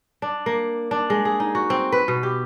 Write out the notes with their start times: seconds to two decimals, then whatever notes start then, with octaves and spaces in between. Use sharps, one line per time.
0.22 D4
0.46 A#3
0.91 D4
1.10 G#3
1.25 G#4
1.40 D#4
1.55 F#4
1.70 C4
1.92 B4
2.08 B2
2.23 G4